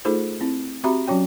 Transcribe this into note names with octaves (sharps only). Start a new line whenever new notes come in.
A3 D#4 F4 G#4 A4 C5
C4 E4
C4 F#4 G4 E5 A#5 B5
F#3 C#4 F#4 C#5 G5